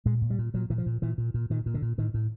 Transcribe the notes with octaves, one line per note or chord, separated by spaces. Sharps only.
A#2 G#3
A#2
G3
A#2
A#2 F#3
A#2 E3
F3
A#2
A#2 E3
A#2
A#2
A#2 D#3
A#2
D3
A#2
A2 D#3
A2